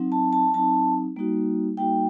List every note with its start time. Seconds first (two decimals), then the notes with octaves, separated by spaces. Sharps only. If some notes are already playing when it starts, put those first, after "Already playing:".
Already playing: F#3 C4 D#4
0.12 A5
0.33 A5
0.54 F#3 C4 D#4 A5
1.16 G3 A#3 D#4 F#4
1.77 G3 A#3 D#4 F#4 G5